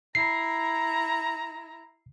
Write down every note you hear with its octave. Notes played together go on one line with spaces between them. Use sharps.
E4 A#5 C7